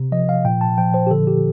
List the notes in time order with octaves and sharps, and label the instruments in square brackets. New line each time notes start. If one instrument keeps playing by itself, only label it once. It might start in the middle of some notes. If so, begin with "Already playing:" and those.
Already playing: [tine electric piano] C3
F3 D#5
F5
A#2 G5
A5
F3 G5
C5
G4
D3 A4
G4